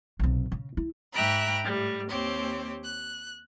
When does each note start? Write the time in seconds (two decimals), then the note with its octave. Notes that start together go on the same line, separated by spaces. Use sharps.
0.19 B1 C3
0.52 C#3
0.77 E4
1.14 G#2 E5 G5 A#5 B5 F#6
1.64 A2 G3
2.08 D#2 C4 G4 C#5
2.83 F#6